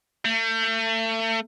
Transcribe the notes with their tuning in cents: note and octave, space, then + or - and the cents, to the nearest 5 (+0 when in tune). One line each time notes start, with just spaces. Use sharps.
A3 +35